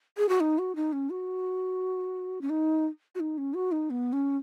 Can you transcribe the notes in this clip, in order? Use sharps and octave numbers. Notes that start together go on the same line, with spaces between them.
G#4
F#4
D#4
F#4
D#4
C#4
F#4
C#4
D#4
F#4
D#4
C#4
F#4
D#4
B3
C#4